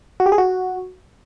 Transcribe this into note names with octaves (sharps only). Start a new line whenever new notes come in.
F#4
G4
G#4
F#4